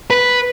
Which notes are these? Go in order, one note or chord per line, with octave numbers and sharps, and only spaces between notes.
B4